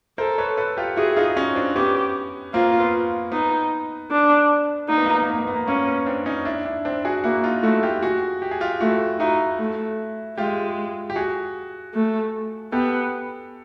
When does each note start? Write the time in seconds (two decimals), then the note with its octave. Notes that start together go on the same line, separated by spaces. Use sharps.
0.18 A4 A#4 C5
0.38 B4 C#5
0.57 A4 B4
0.77 F4 G4
0.96 E4 F#4 G#4
1.16 D#4 F4
1.37 C#4 D#4
1.55 C4 D4
1.75 B3 C#4 G4
2.54 A#3 C4 F4
2.80 B3
3.32 B3 D#4
4.11 D4
4.89 A#3 D#4
4.97 B3
5.06 A#3
5.14 B3
5.22 A#3
5.30 B3
5.39 A#3
5.47 B3
5.55 A#3
5.68 A#3 C#4
5.87 B3
6.06 C4 D4
6.26 C#4 D#4
6.45 D4 E4
6.65 D4 E4
6.85 C4 D4
7.05 F#4 G#4
7.24 A#3 E4 F#4
7.44 D#4 F4
7.63 A3 E4 F#4
7.83 F4 G4
8.03 F#4 G#4
8.42 G4
8.51 G#4
8.61 F4 G4
8.81 A3 E4 F#4
9.20 D#4 E4 F#4
9.59 A3
10.38 G#3 F4 G4
11.10 G4
11.16 F#4 G#4
11.94 A3
12.72 B3 G4 A4